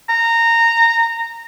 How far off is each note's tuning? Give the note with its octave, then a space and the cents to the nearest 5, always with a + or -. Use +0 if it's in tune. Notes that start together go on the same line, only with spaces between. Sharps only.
A#5 -15